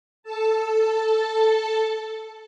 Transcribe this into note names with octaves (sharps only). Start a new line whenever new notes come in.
A4 A5